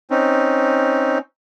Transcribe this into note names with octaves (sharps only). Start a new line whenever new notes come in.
C4 C#4 D#4